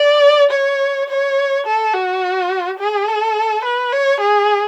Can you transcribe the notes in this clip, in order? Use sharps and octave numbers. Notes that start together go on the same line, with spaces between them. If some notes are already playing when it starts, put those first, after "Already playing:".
Already playing: D5
C#5
C#5
A4
F#4
G#4
A4
B4
C#5
G#4